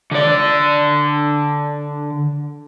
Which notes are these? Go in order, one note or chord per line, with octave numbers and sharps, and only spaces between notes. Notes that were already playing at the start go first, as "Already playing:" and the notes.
D3 D5